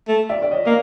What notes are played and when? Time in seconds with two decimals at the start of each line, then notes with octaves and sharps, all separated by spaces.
0.08 A3
0.29 D5 E5
0.42 D5
0.51 C#5 D#5
0.65 A#3 D#5